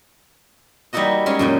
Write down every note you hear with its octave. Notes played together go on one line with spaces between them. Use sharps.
G3 A#3 D#4 E4 F#4 D#5
G#3 C#4 C6
F#2 A#2 G5